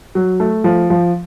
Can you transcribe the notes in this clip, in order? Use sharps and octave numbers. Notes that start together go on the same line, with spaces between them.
F#3
A3
F3
F3